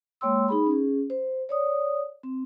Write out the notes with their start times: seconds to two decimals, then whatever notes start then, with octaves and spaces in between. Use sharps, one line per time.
0.21 G#3 A#3 C#5 G5 C6 E6
0.48 D#4 G#4 B5
0.67 C#4 G#4
1.10 C5
1.49 C#5 D5 D#6
2.23 C4